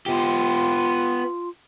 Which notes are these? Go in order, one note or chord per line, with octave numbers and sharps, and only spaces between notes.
B3 F4 G4